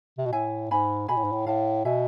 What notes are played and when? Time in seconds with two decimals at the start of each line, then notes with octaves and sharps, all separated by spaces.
0.18 C3
0.26 B2
0.33 A2 E5 G#5
0.71 G#2 G#5 B5
1.08 B2 G#5 B5
1.16 A2
1.24 G#2
1.32 A2
1.46 A2 F5 A5
1.85 B2 E5 G#5